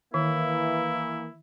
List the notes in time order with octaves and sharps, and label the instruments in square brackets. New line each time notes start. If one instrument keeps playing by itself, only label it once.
[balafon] D#3 [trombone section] E3 A#3 [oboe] E4